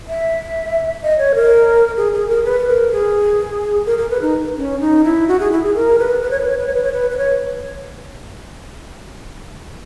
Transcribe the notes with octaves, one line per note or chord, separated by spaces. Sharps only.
E5
D#5
C#5
A#4
G#4
G#4
A#4
B4
A#4
G#4
A#4
A#4
B4
D#4
C#4
D#4
E4
F#4
G#4
E4
G#4
A#4
B4
B4
C#5
B4
C#5
B4
C#5
B4
C#5
B4
B4
C#5